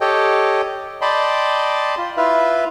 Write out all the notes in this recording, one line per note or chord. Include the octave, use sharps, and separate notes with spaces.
G4 A4 C#5 D#5 G5
D5 D#5 G5 A5 B5 C6
F4
E4 F4 B4 E5 F5